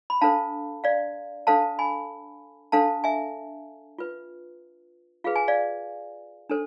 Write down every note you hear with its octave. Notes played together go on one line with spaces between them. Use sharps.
B5
D4 A4 C5 F5 A5
D5 F5
D4 A4 C5 F5 A5
G#5 B5
D4 A4 C5 F5 A5
E5 G#5
F4 B4
F4 G#4 B4 F5
G#5
D5 F5
D4 A4 C5